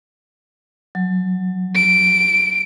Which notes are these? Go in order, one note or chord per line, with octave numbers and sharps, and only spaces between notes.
F#3
D7